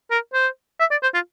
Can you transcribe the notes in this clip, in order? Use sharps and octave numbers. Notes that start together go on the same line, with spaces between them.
A#4
C5
E5
D5
C5
F4